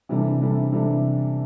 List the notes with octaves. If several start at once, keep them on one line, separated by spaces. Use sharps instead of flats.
C3 E3 G3 D4 A4
C3 E3 G3 D4 A4
C3 E3 G3 D4 A4